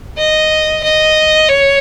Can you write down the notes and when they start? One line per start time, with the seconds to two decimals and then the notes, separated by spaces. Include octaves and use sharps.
0.18 D#5
0.84 D#5
1.49 C#5